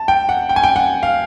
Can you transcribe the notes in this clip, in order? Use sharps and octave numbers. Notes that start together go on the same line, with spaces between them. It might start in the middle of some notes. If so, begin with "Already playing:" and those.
Already playing: A5
G5
F#5
G5
G#5
G5
F#5
F5